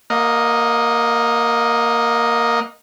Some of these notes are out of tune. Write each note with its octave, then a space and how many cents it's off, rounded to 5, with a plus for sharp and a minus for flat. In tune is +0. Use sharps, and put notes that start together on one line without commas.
A#3 +0 D#5 +0 F#5 -40